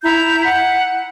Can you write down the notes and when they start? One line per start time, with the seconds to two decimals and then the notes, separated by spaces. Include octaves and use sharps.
0.02 E4 A#5 G6
0.44 F#5